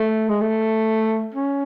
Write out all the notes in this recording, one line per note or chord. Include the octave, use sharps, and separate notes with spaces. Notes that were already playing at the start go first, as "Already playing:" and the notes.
Already playing: A3
G#3
A3
C#4